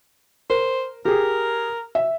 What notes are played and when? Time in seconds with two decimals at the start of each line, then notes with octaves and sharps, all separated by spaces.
0.50 A#4 C5
1.05 G4 G#4 A#4
1.95 E5